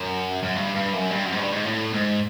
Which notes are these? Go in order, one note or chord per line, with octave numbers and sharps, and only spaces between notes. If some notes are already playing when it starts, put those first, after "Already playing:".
Already playing: F#2
F#2
G2
G2
F#2
G2
F#2
G#2
G2
G#2
A2
G#2